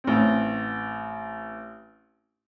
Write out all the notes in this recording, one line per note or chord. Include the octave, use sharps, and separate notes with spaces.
A1 C4